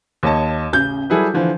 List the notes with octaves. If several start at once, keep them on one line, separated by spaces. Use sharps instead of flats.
D#2 C#5 D#5 A5
A1 C#3 G6
F#3 G3 E4 G#4 A4 B4
D3 E3 F3